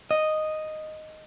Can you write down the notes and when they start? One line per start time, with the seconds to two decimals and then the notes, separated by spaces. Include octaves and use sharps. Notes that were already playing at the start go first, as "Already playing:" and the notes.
0.11 D#5